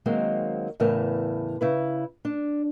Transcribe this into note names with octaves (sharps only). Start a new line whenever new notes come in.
D#3 F#3 G#3 A#3 C4
E2 A2 C#3 E3 A#4 A5
C#3 E4 B4
D4